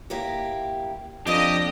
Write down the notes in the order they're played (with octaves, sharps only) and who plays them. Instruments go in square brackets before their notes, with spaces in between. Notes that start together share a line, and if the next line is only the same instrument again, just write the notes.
[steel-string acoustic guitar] A#3 E4 G4
[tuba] F2 [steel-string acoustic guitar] D3 A#3 D4 [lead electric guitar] G4 [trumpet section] D#5